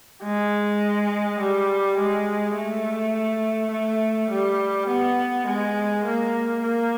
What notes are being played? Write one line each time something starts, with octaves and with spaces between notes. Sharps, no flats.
G#3
G3
G#3
A3
A3
G3
B3
G#3
A#3
A#3